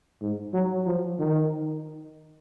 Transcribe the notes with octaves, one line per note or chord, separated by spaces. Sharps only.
G#2
F#3
F3
D#3